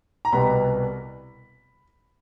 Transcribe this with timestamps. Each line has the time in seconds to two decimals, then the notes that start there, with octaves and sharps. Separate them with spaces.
0.25 A#5
0.32 C2 B2 G3 B3 B5